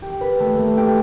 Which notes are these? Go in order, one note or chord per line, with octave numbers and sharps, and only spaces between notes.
G4
B4
A3
A3
G4